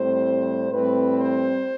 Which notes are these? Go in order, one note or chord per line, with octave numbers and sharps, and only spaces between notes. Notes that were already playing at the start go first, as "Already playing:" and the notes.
Already playing: A2 G3 C4 C5
A2 G3 C4 B4
C5